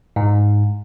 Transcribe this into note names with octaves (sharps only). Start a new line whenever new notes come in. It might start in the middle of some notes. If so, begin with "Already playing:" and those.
G#2